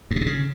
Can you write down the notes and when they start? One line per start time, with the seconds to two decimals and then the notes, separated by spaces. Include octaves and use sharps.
0.11 G2
0.16 B2
0.21 C3
0.26 C#3